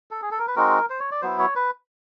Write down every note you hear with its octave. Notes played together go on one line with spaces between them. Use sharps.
A4
G#4
A4
A#4
B4
G#3 C4 D#4 F#4 A#4
C5
C#5
D5
F#3 B3 E4 C5
C#5
B4